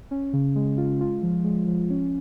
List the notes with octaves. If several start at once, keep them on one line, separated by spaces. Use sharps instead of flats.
C#4
C#3
G#3
F4
F4
F3
G#3
F3
C#4